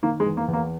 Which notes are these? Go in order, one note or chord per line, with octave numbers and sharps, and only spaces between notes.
D#3 A#3
G#3
E2
A#3
E2
A#3